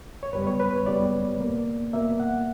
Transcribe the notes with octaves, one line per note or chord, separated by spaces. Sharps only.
C#5
F#2 C#3 G3 B3 B4
C#5
B4
C#5
F#2 C#3 G3 B3 D5
B2 A#3
B2 A#3 E5
F#5